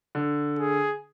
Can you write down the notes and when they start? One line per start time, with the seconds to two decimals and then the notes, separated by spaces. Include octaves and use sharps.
0.15 D3
0.59 G#4